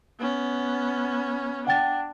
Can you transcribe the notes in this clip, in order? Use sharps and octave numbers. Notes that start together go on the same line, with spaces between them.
B3 C#4
D4 F#5 G5 A6